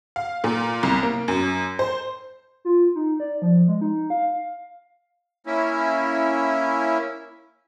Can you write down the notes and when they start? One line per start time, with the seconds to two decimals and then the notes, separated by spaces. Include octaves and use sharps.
0.16 F5
0.44 A#2
0.83 C2
1.03 A#3
1.28 F#2
1.79 C5
2.65 F4
2.95 D#4
3.20 D5
3.42 F3
3.68 G#3
3.81 D#4
4.10 F5
4.33 F5
5.47 A#3 C#4 E4